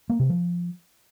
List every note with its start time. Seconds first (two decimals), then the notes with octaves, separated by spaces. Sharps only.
0.10 A#3
0.19 C3
0.29 F3